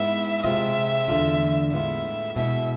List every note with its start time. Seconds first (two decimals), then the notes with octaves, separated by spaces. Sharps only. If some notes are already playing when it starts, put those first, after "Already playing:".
Already playing: G#2 G#3 B3 E4 E5
0.44 C3 G#3 C4 F4 E5
1.08 E2 D3 A3 D4 F4
1.73 A2 G#3 B3 F4 E5
2.36 B2 G#3 B3 E4 E5